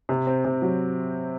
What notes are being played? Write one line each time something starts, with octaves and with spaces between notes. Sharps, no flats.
C3
C4
C3
F#3